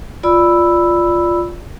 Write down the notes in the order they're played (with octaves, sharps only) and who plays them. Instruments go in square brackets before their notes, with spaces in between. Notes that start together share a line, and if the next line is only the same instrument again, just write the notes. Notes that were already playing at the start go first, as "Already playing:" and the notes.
[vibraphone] F4 D5 B5 E6